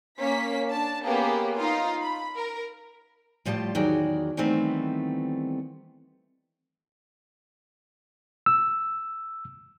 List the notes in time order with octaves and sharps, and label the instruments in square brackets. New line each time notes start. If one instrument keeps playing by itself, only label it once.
[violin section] A#3 C#4 B6
D4 A5
A#3 B3 C#4 G4 G#4
D#4 F4 F5
B5
A#4
[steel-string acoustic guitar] A2 F3 G3 F4 A5
E2 D#3 F#3 G#4 D5
D#3 E3 G3 A3 B3 C4
[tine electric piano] E6